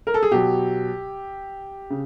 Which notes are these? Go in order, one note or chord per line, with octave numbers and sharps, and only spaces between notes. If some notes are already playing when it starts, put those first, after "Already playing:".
A#4
A4
G#4
B2 F#3 G4
C#3